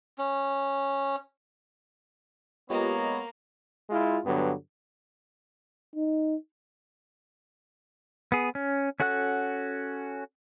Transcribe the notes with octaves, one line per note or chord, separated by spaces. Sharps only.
C#4
G#3 A#3 B3 F4 G4 C#5 D#5 A#5
G#3 E4 F4
G2 D3 F#3 B3
D#4
B3 G#4
C#4
C#4 F#4 A4 F#5 F#6